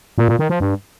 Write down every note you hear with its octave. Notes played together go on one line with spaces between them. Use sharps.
A#2
A#2
D#3
F3
G2